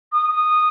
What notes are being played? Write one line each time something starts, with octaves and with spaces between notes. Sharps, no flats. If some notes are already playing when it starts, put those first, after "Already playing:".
D#6
D#6